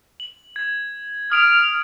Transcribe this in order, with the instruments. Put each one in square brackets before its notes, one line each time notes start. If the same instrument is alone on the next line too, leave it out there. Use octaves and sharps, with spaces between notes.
[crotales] F#7
G#6
[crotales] D#6 D7 F7 [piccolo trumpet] F6